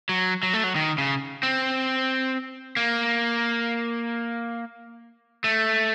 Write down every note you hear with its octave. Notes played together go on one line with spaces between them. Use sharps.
F#3
F#3
A3
F#3
D#3
C#3
C4
A#3
A3